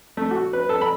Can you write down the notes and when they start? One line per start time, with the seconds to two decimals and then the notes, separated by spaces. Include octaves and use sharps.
0.17 A3
0.31 F#4
0.53 B4
0.69 A4
0.81 B5